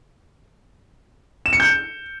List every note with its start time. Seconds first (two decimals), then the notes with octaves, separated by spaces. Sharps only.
1.46 E7
1.53 C#7
1.60 G6